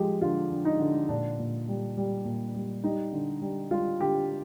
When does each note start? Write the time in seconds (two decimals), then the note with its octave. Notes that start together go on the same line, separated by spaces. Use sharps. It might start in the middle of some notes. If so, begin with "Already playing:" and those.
Already playing: F3 G#3 G4
0.21 D3 F4
0.51 D3
0.65 D#4
0.79 D3
1.09 A#2 D4
1.39 A#2
1.68 G3
1.97 G3
2.25 A#2
2.55 G3
2.84 G3 D#4
3.13 D3
3.42 G3
3.71 G3 F4
4.00 D3 G4